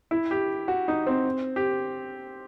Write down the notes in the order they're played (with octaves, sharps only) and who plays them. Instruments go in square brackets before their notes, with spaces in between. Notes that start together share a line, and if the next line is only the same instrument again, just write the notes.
[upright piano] E4
G4
F#4
D#4
C4
G4